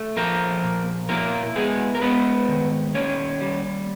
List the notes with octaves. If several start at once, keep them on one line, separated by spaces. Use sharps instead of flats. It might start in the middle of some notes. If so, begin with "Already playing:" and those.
Already playing: A3
F3 A#3 A#4
A#2
A#3 E4 A#4
G#3 B3 G#4
A#4
G#3 B3 B4
D#3
A#3 C#4 C#5
G3